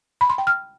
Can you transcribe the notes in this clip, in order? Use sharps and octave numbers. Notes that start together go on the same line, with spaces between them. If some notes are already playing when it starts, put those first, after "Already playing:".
B5
C6
G5
F6